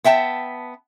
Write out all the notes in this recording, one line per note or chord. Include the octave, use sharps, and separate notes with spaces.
B3 E5 G5 A5